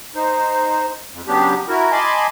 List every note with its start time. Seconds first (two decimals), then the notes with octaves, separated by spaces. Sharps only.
0.15 D#4 C5
1.11 F2
1.27 C#3 F#3 B3 D4 G4
1.68 E4 F#4 A#4
1.92 D#5 G#5 A5 B5 C6 D6